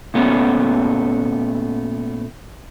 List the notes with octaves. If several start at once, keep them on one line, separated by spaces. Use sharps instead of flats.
A#2 A3 B3 C#4